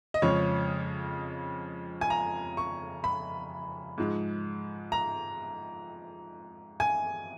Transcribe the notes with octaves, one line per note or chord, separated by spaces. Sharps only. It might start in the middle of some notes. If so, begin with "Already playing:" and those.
D#5
F2 C#3 F3 G#3 C#5
G#5
A#5
C#6
B5
G#2 F3 G#3
A#5
G#5